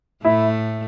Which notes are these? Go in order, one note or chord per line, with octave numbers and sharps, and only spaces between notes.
A2 A3 E4